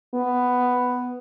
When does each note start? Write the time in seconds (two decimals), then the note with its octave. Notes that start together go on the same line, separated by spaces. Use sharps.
0.14 B3